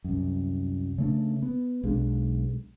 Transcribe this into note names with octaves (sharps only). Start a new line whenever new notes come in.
C2 F#2
C#3 A3 D4
B3
B1 G#3 D4